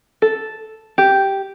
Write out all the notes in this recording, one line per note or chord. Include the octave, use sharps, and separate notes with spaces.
A4
G4